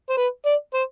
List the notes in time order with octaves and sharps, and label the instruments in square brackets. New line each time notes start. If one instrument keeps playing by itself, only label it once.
[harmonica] C5
B4
D5
C5